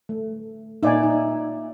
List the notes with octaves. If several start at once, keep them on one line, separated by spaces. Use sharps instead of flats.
A3
A#2 D#4 D5 E5 G#5
D#4